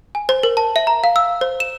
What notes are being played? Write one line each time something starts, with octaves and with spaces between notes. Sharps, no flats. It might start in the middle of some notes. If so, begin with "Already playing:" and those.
G#5
C5
A#4
A5
E5
A#5
F5
E6
C5
E7